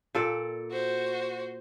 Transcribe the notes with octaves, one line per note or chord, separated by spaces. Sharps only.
A#2 A4 D5
F#4 C5